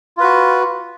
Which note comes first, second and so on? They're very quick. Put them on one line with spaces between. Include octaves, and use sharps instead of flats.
F4 B4 F#4